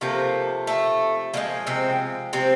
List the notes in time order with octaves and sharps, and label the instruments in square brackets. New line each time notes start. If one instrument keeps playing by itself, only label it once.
[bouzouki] C3 F3 A3 A#3
A3
D3 F3 G#3 A#3
C3 C4
C3 C4